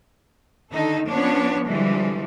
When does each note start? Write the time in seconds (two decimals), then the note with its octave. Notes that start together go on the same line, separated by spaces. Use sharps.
0.71 D3 D#3 D#4 A4
1.08 F3 B3 C#4 D4 C#5
1.67 D3 E3 F3 G3 G#3